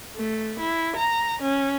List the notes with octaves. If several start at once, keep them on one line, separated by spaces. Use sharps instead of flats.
A3
E4
A#5
C#4